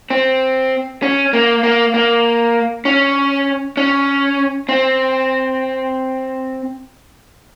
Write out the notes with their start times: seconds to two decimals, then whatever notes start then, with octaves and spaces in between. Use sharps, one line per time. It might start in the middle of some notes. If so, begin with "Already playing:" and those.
0.10 C4
1.03 C#4
1.33 A#3
1.63 A#3
1.94 A#3
2.85 C#4
3.77 C#4
4.69 C4